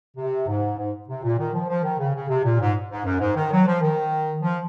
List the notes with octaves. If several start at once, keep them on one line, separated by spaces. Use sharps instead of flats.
C3
G#2
G#2
C3
A#2
D#3
F3
F3
D#3
C#3
C#3
C3
A#2
G#2
G#2
F#2
G#2
D#3
F#3
F3
D#3
F3